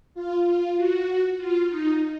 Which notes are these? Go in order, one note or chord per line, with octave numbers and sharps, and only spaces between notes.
F4
F4
F#4
F4
D#4